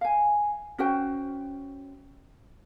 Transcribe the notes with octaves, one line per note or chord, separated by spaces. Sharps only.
F5 G#5
C#4 F#4 C5 G5